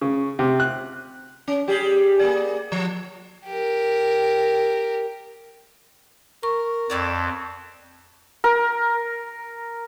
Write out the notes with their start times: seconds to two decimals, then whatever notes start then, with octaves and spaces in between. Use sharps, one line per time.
0.01 C#3
0.39 C3
0.60 F#6
1.48 C#4
1.68 G3 G4 G#4
2.19 A#3 G#4 D5
2.72 F3
3.46 G4 A#4
6.43 A#4 C#6
6.90 F2 A4 C#5 D5
8.44 A#4